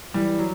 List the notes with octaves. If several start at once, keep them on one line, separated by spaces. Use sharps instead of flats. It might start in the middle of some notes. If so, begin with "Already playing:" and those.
E3 G3
F#3